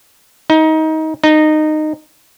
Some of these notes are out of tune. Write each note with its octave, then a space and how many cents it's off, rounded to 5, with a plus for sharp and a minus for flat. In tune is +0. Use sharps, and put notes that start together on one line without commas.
D#4 +25
D#4 -15